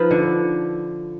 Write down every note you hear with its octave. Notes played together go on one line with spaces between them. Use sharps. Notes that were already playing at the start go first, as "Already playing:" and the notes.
Already playing: F3 D#4 B4 B5
D3